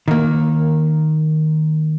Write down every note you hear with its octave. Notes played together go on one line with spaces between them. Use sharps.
D#3 A#3